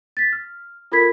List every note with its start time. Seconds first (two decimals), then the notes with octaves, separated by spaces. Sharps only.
0.17 A6 B6
0.32 F6
0.92 F4 A4 A#4 B5 G#6 B6